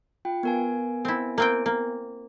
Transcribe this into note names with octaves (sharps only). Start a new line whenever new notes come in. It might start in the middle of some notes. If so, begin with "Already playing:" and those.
F4 G5
B3 A#4 G#5
C4 E4
A#3 C4 G5
A#3